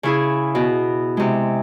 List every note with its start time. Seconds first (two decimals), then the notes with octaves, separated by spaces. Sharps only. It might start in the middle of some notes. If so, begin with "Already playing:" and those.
0.03 C#3 E4 G#4
0.55 B2
1.17 C3 G#3